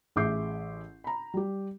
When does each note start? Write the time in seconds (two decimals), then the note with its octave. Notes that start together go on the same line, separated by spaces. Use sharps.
0.16 A1 G#4 E5 D6 G6 C7
1.04 A#5 B5
1.34 G3 G4